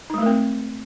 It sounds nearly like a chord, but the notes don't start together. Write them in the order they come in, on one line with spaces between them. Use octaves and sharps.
D#4 G#3 A3 A#4 C4